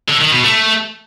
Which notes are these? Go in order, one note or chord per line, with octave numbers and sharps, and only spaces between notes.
D3
D#3
B2
A3